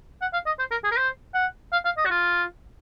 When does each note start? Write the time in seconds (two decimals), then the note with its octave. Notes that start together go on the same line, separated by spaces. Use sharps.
0.22 F#5
0.33 F5
0.46 D#5
0.59 C5
0.71 A#4
0.84 G#4
0.91 A#4
0.97 C5
1.34 F#5
1.73 F5
1.85 F5
1.97 D#5
2.06 F#4
2.10 F4